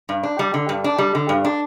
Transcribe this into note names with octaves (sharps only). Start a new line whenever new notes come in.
G2
D4
G3
D3
G2
D4
G3
D3
G2
D4